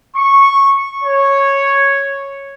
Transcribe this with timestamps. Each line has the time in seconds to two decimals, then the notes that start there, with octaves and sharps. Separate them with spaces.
0.14 C#6
1.04 C#5